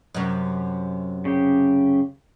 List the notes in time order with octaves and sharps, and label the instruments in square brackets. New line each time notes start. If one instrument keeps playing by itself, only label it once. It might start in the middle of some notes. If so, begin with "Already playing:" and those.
[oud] F#2 C3
[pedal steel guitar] C#3 G4